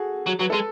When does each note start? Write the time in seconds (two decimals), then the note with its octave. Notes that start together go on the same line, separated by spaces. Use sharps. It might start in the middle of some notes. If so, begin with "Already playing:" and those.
Already playing: F#4 G#4 A4
0.26 F#3
0.39 F#3 B4
0.50 G#3 A4